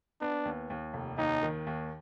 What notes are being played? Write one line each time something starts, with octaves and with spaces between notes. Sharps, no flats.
B3 D4
D#2
D#2
F1
D#2 D#4
D#3
D#2